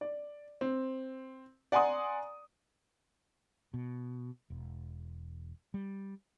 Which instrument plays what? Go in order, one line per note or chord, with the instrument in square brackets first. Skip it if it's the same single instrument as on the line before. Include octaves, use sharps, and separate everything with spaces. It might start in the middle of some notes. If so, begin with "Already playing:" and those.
[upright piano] D5
C4
D5 F#5 G#5 A#5 C6 D#6
[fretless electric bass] B2
E1
G3